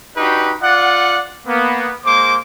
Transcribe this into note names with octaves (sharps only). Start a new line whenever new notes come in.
D4 D#4 F#4 G4 B4
F4 D5 F#5
A#3 B3
G#3 A#3 C5 D6